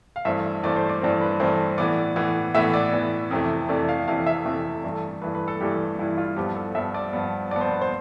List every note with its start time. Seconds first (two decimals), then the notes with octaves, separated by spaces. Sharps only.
0.16 F5
0.25 G2 E3 A3 C4 E5
0.63 G2 E3 A3 C4 D5
0.76 C5
0.89 D5
1.02 G2 E3 A3 C4
1.21 B4
1.40 G2 E3 A3 C4
1.78 A2 E3 B3 D5
2.16 A2 E3 B3
2.55 A2 E3 B3 E5
2.74 D5
2.92 A2 E3 B3
3.31 F2 C3 E3 A3
3.69 F2 C3 E3 A3 D5
3.88 F5
4.08 F2 C3 E3 A3 F5
4.26 E5
4.45 F2 C3 E3 A3
4.84 G2 E3 A3
5.22 G2 E3 A3 B4
5.35 B4
5.48 A4
5.60 G2 E3 A3 G4
5.99 G2 E3 A3 E4
6.17 F4
6.36 G2 F3 B3 G4
6.56 A4
6.75 G2 F3 B3 E5
6.94 D5
7.13 G2 F3 B3
7.51 G2 F3 B3 D5
7.61 C5
7.71 B4
7.81 C5